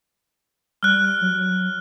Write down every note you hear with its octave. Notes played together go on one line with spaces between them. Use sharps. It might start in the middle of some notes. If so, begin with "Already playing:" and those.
G3 F6 F#6
F#3